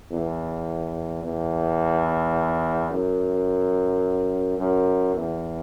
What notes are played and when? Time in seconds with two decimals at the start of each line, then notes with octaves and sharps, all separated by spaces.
0.11 E2
1.23 E2
2.91 F#2
4.58 F#2
5.14 E2